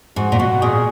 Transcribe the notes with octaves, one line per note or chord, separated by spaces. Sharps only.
G#2 F#4
A#2
B2 F#4
A#2 G#4